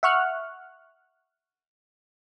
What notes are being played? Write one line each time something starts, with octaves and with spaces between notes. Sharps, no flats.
E5 F#5 C#6 F6 F#6